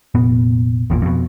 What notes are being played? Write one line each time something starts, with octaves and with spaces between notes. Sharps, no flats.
F1 A#2 B3
G#1 E2 A#2
F2 B2